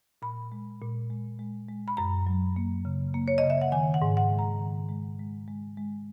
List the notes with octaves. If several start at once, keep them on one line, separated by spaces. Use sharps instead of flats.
A#2 B5
G#3
A#2
G#3
G#3
G#3
B5
F#2 A#5
F#3
A#3
C#3
A#3
C#5
D#5
C#3
E5
F#5
D#3 G#5
F#5
G#2
F#5
G#3
A#5
D#3
G#3
G#3
G#3
G#3